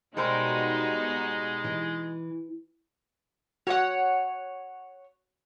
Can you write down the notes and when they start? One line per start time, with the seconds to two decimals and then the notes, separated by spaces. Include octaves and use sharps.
0.17 B2 G3 G#3 D#4 F#4 A#4 C5
1.64 E3
3.67 F#4 C#5 F#5